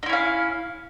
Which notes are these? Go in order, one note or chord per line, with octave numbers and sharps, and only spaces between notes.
C#4 D#4 E4 F5